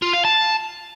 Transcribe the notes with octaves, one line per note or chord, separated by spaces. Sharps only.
F4
F5
A5